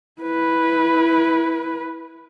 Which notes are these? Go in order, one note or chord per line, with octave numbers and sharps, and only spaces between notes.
E4 B4